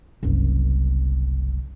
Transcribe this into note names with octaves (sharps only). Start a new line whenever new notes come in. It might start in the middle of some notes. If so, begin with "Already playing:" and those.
F#1 C2